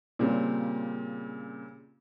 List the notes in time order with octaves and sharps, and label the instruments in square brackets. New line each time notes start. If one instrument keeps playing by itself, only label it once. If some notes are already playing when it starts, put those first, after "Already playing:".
[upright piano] A#2 C#3 G3 C4